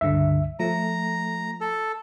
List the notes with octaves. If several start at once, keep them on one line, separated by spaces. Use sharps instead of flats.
C#2 G2 D3 E5
F3 A3 A#5
A4